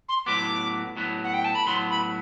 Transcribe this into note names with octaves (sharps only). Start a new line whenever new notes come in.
C6
A2 F#3 B3 D6
A2 F#3 B3
F#5
G5
A5
B5
A2 F#3 B3 C6
B5